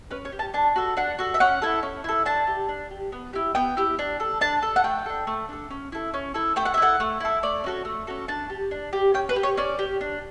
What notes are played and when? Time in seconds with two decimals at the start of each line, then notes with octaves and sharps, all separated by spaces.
0.11 C#4 B4
0.25 C#5
0.32 G4
0.39 A5
0.54 D4 A5
0.76 F#4 A4
0.97 D4 F#5
1.18 F#4 A4
1.34 E5
1.40 C#4 F#5
1.62 E4 A4
1.83 C#4
2.04 E4 A4
2.26 D4 A5
2.47 G4
2.69 D4
2.91 G4
3.12 B3
3.33 E4 G4
3.55 B3 G5
3.77 E4 G4
3.99 D4
4.20 A4
4.41 D4 A5
4.62 A4
4.76 F#5
4.84 A3 G5
5.06 D4 A4
5.27 A3
5.49 D4 A4
5.71 C#4
5.92 E4 A4
6.14 C#4
6.34 E4 A4
6.56 A3 G5
6.65 F#5
6.74 E5
6.78 E4 A4 F#5
7.00 A3
7.20 E4 A4
7.43 A3 D5
7.64 C#4 F#4 A4
7.85 A3
8.07 C#4 F#4 A4
8.28 D4 A5
8.50 G4
8.71 D4
8.93 G4
9.14 C#4 G5
9.29 B4
9.36 G4
9.43 C#5
9.57 C#4 D5
9.79 G4
10.01 D4